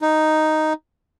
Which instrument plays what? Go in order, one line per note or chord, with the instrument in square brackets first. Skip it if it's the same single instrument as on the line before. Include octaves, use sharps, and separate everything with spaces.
[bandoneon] D#4